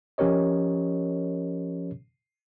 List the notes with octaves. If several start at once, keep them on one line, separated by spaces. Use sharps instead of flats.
F3 C#4 G4 A#4 C#5 D#5